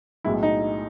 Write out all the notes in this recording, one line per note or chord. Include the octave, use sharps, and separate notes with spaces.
B1 A2 G#3 E4
D#4